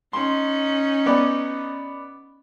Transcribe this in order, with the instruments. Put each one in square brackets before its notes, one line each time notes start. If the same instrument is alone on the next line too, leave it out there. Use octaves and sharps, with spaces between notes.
[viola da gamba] C#4 D#4 [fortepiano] C6
[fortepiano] B3 D5